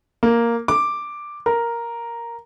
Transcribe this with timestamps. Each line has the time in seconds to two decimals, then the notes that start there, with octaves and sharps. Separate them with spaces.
0.23 A#3
0.68 D6
1.46 A#4